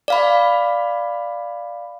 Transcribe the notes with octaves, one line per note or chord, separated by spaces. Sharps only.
D5 F5 B5